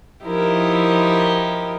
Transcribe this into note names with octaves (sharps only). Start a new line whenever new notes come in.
F3 D#4 E4 G4 A#4